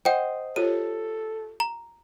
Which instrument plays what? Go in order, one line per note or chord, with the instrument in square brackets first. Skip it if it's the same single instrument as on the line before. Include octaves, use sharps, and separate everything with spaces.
[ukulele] C5 D#5 [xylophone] F#5 G5
[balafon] F4 G4 C#5 [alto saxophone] A4 [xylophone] D#7
[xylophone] A#5